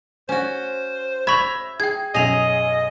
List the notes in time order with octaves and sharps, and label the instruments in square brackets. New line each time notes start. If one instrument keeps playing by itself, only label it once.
[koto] C#4 F#4 [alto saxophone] C5
[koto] E5 [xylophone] B5 C#6 [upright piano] G#6 A#6 F7
[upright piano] G#4 [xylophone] G5 G#6
[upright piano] B1 F#2 [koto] G#4 [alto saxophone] D#5 [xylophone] A#6 F7